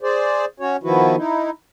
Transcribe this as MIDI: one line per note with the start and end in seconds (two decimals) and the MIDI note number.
0.01 0.45 68
0.01 0.45 72
0.01 0.45 74
0.60 0.77 61
0.60 0.77 66
0.60 0.77 73
0.83 1.16 51
0.83 1.16 53
0.83 1.16 59
0.83 1.16 64
0.83 1.16 66
0.83 1.16 71
1.16 1.50 63
1.16 1.50 64